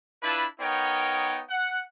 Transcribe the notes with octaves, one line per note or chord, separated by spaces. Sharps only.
D4 E4 F4 B4 A5 B5
B3 D#4 A#4 C#5 G5
F#5